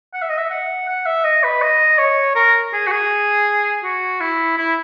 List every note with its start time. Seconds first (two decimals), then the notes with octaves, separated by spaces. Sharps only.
0.14 F#5
0.22 E5
0.29 D#5
0.38 E5
0.50 F#5
0.88 F#5
1.06 E5
1.24 D#5
1.43 B4
1.62 D#5
1.98 C#5
2.35 A#4
2.73 G#4
2.87 F#4
2.91 G#4
3.84 F#4
4.20 E4
4.58 E4